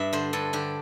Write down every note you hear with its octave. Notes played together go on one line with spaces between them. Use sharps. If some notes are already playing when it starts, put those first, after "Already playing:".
Already playing: G2 E5
D3 C5
G2 A4
D3 G4